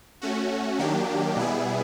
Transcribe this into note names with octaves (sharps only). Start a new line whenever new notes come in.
A3 C#4 F#4
D#3 F#3 A#3 D4 G4
B2 G3 B3 E4 G#4